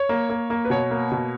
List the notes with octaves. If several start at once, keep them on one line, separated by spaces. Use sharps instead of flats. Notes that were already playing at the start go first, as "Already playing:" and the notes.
Already playing: C#5
A#3
A#3
A#3
B4
B2 C#5
A#3
B2